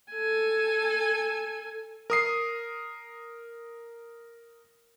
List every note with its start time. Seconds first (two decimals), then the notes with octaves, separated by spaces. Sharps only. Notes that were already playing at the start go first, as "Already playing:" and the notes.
0.12 A4 G#5
2.10 A#4 D#6 C7